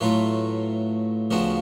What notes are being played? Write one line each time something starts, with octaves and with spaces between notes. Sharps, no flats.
A2 F#3 A3 F4 B4
D2 C#3 F3 B3 F#4